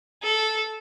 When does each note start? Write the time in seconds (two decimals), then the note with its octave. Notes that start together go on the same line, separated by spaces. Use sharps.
0.23 A4